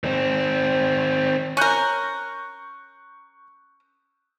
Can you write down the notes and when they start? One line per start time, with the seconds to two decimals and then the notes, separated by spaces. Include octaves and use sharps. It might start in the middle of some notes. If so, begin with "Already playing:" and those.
0.04 D#3 C4
1.57 C#4 A#4 C#6 F#6 G6